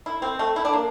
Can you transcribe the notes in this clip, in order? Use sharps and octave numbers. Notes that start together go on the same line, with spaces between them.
E4
C4
A3
E4
D4
A#3